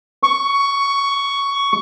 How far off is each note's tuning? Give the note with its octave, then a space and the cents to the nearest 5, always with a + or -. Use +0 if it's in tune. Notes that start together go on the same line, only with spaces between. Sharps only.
C#6 +10